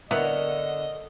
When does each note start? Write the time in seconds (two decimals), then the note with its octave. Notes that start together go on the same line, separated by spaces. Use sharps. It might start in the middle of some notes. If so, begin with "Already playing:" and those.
0.11 D3 B3 E4 A4 A#4 C#5 D#5 F#5